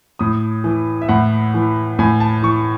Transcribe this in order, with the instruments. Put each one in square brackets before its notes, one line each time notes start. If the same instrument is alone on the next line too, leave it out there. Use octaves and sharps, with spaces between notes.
[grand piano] A2 D#6
E3
E5
A2 F#5
E3
A2 G#5
A5
E3 C#6